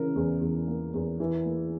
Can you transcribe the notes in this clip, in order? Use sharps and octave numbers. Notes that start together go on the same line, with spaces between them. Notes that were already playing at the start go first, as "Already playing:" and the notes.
Already playing: C#3 E3 A#4
E2
E2
A#3
E2
E3
A#3